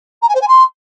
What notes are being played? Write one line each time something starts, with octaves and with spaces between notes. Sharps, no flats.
A#5
G#5
C5
G#5
C6